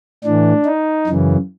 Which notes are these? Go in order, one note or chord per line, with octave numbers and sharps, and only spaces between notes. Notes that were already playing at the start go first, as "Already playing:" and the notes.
A2 E3 D4
D#4
F#2 C#3 E3